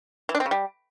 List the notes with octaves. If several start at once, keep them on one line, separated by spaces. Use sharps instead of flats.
E3
D4
C4
C#3
G3